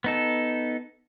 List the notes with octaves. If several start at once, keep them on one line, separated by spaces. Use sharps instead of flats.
B3 D#4 A4